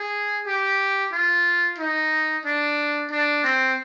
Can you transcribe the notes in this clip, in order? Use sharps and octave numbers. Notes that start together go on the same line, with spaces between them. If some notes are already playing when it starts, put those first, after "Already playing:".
Already playing: G#4
G4
F4
D#4
D4
D4
C4